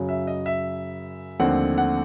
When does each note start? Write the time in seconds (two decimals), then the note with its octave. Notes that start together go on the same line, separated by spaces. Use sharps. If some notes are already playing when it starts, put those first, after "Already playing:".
Already playing: F#2 C#3 F#3
0.09 E5
0.27 D#5
0.46 E5
1.39 D#2 D3 F3 A3 C4 F#5
1.78 F#5